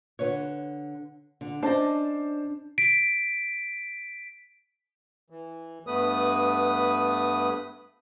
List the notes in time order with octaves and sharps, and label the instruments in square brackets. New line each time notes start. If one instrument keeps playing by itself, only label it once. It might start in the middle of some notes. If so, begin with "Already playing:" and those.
[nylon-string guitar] D3 B4 C#5
D3
[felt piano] C#4 C5 A5 [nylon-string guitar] D4 D#5
[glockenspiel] B6 D7
[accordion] E3
G2 A3 B3 B4 D#6